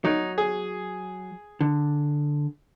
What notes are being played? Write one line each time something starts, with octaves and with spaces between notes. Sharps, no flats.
F#3 D#4
G#4
D3